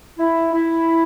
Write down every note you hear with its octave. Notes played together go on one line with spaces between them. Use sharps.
E4
E4